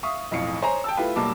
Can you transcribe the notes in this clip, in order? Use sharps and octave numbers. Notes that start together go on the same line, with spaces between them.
E5 F5 C#6 D#6
B1 F2 A2 F5 C#7
C5 C#5 G#5 A#5
G5 A5 E6
A3 E4 F4 G4 B4
B1 F#3 G3 A#3 A5 D6